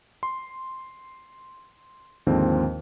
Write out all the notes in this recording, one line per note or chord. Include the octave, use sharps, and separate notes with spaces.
C6
D#2 G#2 D3 F3 C4